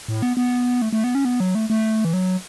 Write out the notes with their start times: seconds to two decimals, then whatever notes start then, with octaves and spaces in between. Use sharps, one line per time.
0.08 A2
0.22 B3
0.37 B3
0.82 A3
0.93 A3
1.04 B3
1.15 C#4
1.25 B3
1.40 F#3
1.55 A3
1.70 A3
2.05 E3
2.13 F#3